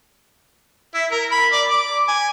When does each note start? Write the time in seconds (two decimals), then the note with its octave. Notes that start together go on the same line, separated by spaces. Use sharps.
0.94 E4
1.11 A#4
1.31 B5
1.52 D5
1.70 D6
2.08 G#5